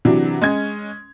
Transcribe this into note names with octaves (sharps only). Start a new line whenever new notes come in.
C3 E3 F#3 D4
G#3 C#4 G#6